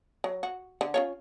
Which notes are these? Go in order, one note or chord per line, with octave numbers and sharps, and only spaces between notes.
F#3
F#4
D3
C#4 F4 C#5